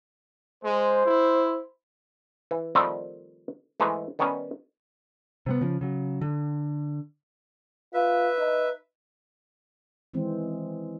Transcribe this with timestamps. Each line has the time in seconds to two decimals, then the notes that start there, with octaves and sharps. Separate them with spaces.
0.64 G#3 C5
1.05 E4
2.51 E3
2.75 D#3 F3 G3 A3 C4
3.80 G#2 E3 G#3 A3
4.19 D#3 G3 B3 C#4 G#5 A5
5.46 C3 G3 B3
5.61 C#3 F3
5.81 C#3 F#3
6.21 D3
7.94 F4 B4 E5
8.38 D#4
10.14 D#3 E3 G#3 C4